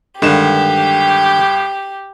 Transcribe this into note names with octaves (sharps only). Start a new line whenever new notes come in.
G2 D3 D#3 G#3 G4 E7